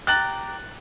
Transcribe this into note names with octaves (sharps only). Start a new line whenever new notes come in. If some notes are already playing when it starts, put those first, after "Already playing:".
G4 A#5 F#6 A6 F#7